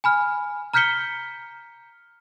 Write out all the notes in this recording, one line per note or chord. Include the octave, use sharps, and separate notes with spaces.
G#5 B5 F6
A#5 F6 G6 B6 C#7 G7